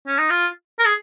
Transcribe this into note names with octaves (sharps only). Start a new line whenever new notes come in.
C#4
D#4
F4
A#4
G#4